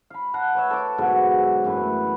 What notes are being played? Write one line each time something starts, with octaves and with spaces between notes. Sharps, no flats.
F5 B5
F5 F#5 A5 A#5
B4 C#5 E5
A4 D6
G#2 B2 D3 F#3
F#2 E3 A3 B4